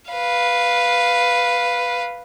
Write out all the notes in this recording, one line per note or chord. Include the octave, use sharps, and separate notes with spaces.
B4 F5